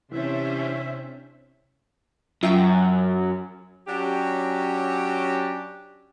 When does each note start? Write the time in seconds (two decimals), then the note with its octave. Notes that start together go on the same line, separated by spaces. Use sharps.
0.12 C3 E3 C#4 D4 C5 E5
2.43 F#2 F4 E5 G5
3.87 F#3 C#4 D4 G4